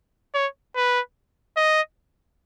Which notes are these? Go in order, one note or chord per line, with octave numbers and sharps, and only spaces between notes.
C#5
B4
D#5